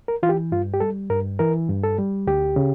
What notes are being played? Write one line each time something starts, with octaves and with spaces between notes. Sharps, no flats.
A#4
E3 F4
G4
G2 F4
G4
G3 A4
G2 A#4
E3 A#4
G2
A4
G3
D2 G4
C#3